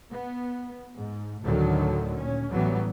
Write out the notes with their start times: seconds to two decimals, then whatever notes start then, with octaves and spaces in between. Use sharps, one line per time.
0.10 B3
0.97 G#2
1.45 D2 A2 D3 D#3 F#3 A3
2.16 A#2 C#4
2.52 A1 A2 E3 F#3 G3 B3